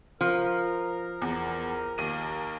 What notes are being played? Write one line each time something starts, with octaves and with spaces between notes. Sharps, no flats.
F3 A#4
E2
D#2 D#7